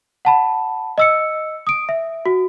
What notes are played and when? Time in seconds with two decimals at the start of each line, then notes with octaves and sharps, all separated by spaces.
0.25 F#5 A5 B5
0.98 D#5 E6 C#7
1.67 D#6 D7
1.89 E5
2.26 F#4